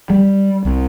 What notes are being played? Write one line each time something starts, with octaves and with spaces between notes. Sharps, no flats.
G3
C2